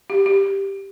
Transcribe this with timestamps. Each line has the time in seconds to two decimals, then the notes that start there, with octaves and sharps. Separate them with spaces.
0.10 G4
0.26 G4